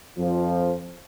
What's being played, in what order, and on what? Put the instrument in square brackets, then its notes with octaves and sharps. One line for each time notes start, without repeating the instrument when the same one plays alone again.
[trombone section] F2 F3